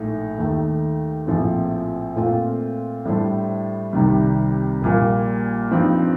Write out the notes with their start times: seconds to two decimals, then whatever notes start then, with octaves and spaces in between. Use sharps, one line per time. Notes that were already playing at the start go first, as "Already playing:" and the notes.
Already playing: A#1 A2 A3 D#4
0.39 D#2 D#3 A3 D#4
1.27 A#1 A2 F3 C4
2.16 A#2 A3 C4 F4
3.05 A2 G3 D4 A4 C5
3.93 C2 C3 D#3 G3
4.82 A#1 A#2 G3 A#3
5.71 G2 F3 C4 D#4